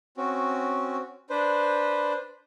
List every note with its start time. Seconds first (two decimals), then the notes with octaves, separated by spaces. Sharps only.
0.17 C4 C#4 F#4
1.30 D4 B4 C5